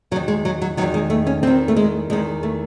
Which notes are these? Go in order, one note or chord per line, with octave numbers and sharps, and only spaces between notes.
E2 D#3 F#3
G#3
F#3
F#3
E2 D#3 F#3
G#3
A3
C#4
E2 D#3 C4
A3
G#3
E2 D#3 G#3
A3